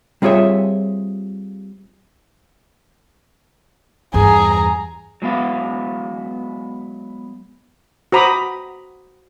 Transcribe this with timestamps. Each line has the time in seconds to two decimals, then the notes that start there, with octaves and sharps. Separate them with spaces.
0.22 G3 C4 F4 G#4 C#5 E5
4.14 E2 G2 G#4 A#5
5.22 F#3 G#3 B3 F5
8.12 F#4 C5 A#5 B5 D6 D#6